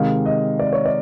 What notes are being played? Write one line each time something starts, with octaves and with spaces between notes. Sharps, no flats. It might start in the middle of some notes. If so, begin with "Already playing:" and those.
Already playing: C3 D#3 G#3 F5
D#5
D5
C#5
D5